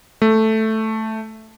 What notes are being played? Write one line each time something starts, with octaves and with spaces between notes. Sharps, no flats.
A3